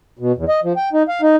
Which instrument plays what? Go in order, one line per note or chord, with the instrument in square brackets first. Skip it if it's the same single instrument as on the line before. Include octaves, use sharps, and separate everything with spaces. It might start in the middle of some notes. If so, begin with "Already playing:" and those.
[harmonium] B2
E2
D#5
F3
G5
D#4
F5
D#4